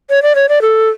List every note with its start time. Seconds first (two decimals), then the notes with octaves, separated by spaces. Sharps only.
0.10 C#5
0.23 D5
0.35 C#5
0.49 D5
0.62 A4